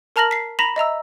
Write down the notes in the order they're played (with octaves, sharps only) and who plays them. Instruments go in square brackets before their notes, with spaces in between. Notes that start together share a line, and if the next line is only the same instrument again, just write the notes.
[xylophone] A#4 A5 A#5 F6 A#6 F#7
B6 C7
A#5 B5 A#6 B6 E7 F7
D#5 E5 A#5 E6